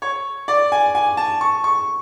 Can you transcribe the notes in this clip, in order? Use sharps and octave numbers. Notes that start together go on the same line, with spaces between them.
C#5
D5
G#5
G#5
A5
C#6
C#6